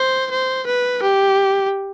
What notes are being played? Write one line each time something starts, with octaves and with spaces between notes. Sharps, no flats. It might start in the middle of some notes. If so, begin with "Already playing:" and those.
Already playing: C5
C5
B4
G4